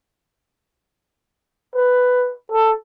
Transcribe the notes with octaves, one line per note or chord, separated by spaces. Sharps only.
B4
A4